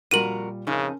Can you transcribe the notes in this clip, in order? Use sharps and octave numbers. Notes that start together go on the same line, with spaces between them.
F2 A#2 G3 F#4 A#4 D#7 F#7
F2 C#3 C#4 D#4 A#4